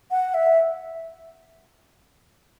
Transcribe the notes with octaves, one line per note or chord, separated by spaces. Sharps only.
F#5
E5